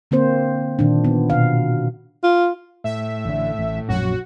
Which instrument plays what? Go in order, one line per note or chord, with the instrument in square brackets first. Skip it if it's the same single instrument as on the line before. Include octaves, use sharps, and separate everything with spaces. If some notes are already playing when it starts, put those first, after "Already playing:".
[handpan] D3 A#3 C4 C5
A#2 D#3 D4
B3
B2 F5
[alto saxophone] F4
[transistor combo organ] A2 [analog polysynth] E5
[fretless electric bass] A1 D3
A1
[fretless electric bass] A#1 F#2 F#3 [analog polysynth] F#4